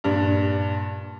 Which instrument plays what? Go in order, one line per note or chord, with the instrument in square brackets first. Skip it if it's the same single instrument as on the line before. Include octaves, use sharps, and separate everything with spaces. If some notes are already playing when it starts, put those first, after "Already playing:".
[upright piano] G2 A#2 D4